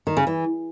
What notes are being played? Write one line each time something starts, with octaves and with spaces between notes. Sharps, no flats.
D#3
C#3
E3